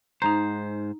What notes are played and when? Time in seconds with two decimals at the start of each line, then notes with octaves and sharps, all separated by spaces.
0.22 G#2 D#4 C5 A#5